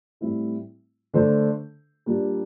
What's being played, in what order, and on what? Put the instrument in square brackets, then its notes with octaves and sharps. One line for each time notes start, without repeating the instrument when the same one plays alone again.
[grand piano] A2 G3 C4 E4
D3 A3 D4 A4 C5
A#2 G3 A#3 D4 G4